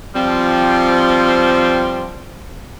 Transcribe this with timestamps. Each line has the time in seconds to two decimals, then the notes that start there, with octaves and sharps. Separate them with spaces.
0.15 F3 G3 C4